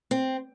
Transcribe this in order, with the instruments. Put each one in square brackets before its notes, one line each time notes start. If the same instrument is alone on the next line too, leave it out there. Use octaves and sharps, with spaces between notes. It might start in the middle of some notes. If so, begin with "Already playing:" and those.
[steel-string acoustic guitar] C4